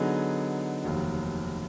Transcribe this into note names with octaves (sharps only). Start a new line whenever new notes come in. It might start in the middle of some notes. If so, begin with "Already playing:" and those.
Already playing: D3 F#3 B3 D#4 G#4
F1 D#2 D#3 F#3